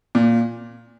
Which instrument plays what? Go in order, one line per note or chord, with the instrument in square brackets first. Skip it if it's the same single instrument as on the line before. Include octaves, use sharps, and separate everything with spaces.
[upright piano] A#2